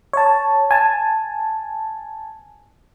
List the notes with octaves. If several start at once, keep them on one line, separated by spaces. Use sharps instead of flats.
C#5 A5
G#5 A5